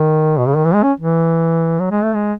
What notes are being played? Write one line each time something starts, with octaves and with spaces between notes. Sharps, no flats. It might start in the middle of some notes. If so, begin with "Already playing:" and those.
Already playing: D#3
B2
C#3
D#3
E3
G#3
C#4
E3
F#3
G#3
A3
G#3